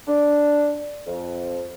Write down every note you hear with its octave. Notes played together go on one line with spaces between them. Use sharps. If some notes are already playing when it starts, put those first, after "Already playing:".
D4
F2